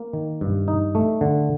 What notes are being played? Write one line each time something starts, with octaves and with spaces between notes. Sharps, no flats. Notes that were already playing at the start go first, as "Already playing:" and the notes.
Already playing: A#3
D#3
G2
D#4
A3
D3